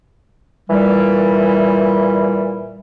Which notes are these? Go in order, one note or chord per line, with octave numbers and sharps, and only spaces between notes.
A#2 E3 G3